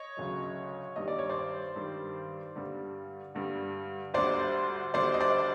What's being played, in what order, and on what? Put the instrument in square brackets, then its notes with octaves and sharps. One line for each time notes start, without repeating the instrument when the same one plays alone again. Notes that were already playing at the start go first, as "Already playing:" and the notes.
Already playing: [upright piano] C#5 D#5
D2 C#3 F#3
G2 D#3 G3 D#5
D5
C#5
C5 D5
G2 D#3 G3
G2 D3 G3
G2 D3 G3
D2 D3 G3 C5 D5
D2 D3 G3 C5 D5
D#5
C5 D5